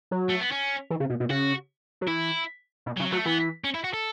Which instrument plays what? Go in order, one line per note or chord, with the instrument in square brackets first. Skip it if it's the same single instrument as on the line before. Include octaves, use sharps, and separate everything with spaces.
[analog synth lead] F#3
[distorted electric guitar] A3
B3
C#4
[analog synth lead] E3
C#3
B2
B2
[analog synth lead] C#3 [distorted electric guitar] F#4
[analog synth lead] F#3
[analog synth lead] E3 [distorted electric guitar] E4
[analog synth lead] B2
[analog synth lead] C#3 [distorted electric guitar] F#3
[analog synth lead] F#3 [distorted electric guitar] A3
[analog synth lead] E3 [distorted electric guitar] B3
[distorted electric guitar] C#4
E4
F#4
A4